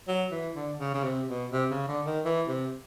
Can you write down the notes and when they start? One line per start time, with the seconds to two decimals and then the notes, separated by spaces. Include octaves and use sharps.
0.08 F#3
0.32 E3
0.55 D3
0.80 C#3
0.94 C#3
1.04 C3
1.28 B2
1.52 C3
1.71 C#3
1.88 D3
2.06 D#3
2.25 E3
2.48 C3